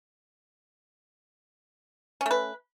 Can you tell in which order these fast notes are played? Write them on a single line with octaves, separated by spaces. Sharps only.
C#4 A3 B4